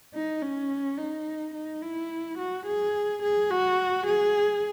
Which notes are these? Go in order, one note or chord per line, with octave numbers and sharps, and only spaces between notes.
D#4
C#4
D#4
D#4
E4
F#4
G#4
G#4
F#4
G#4